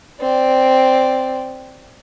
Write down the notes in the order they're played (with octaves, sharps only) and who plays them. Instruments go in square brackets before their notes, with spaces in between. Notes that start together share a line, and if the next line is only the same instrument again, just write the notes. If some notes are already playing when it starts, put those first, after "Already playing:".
[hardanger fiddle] C4 D5